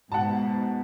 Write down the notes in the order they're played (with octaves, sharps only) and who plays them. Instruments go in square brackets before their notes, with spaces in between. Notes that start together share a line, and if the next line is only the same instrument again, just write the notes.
[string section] G#2 B2 [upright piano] F#5 A5